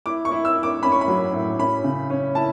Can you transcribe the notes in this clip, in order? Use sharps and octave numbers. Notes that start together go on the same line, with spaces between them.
E4 D6
C#6
E4
E6
E4
D6
C#4 B5
C#6
B5
F#3
A2
C#4 B5
C#3
C#4
E4 A5